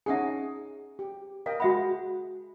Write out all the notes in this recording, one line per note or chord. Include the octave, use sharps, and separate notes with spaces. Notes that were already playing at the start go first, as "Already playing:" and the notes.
C#4 D#4 G#4 E5 F#5 G#5
G4
A#4 D#5 F5 G5
G#3 F#4 E5 F#5 B5